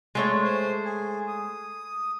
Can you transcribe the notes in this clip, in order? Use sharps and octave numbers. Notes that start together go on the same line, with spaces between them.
G#3 A3 C#5
C5
G#4
D#6